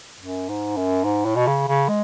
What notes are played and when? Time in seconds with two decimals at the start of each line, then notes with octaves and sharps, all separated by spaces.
0.21 F#2
0.49 G#2
0.77 F#2
1.04 G#2
1.25 A2
1.36 B2
1.47 C#3
1.67 C#3
1.89 G#3